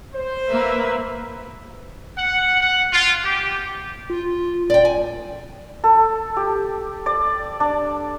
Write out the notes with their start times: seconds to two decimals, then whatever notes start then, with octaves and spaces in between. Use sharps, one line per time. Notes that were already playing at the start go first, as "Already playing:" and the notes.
0.14 C5
0.50 A#3 B4 E5
2.16 F#5
2.61 F#5
2.92 F4
3.24 G4
4.10 F4
4.70 D#1 D5 G5
4.85 G#5
5.84 A4
6.37 G4
7.06 D5
7.60 D4